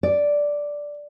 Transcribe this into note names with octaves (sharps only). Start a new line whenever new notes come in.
D5